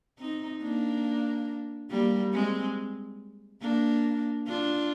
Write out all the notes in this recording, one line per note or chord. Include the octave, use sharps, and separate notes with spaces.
C4 D#4
A#3 D4
G3 A#3
G#3 C4
A#3 D4
D4 F4